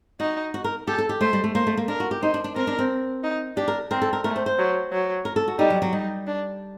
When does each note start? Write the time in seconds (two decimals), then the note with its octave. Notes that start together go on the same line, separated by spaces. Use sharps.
0.20 D#4 F#4
0.54 F#4
0.64 A#4
0.87 G4 A4
0.98 A4
1.09 G4
1.21 A3 C5
1.33 G3
1.44 A3
1.55 A#3 C5
1.67 A3
1.77 A#3
1.88 D4 A#4
2.00 F#4
2.11 G4
2.22 D#4 C5
2.34 D4
2.44 D4
2.55 C4 A#4
2.67 D4
2.79 C4
3.23 D#4
3.56 D4 G4
3.68 A#4
3.91 C4 A#4
4.02 A4
4.13 A#4
4.24 A3 A#4
4.36 C5
4.46 C5
4.58 F#3
4.92 F#3
5.25 A#4
5.36 A4
5.48 F#4
5.58 G3 D#4
5.70 F#3
5.82 F#3
5.93 G3 D#4
6.27 D4